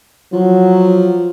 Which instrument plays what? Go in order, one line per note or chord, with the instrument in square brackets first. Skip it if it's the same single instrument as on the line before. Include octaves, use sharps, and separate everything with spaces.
[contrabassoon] F3 [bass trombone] F#3